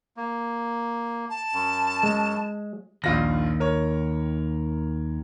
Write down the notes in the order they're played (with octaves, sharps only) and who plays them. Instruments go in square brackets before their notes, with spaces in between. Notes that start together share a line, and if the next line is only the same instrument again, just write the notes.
[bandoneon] A#3
[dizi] A5
[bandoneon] F#2
[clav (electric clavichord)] G#3
[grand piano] A#1 F4 A#6 [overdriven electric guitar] D#2
[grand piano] A#4 C#5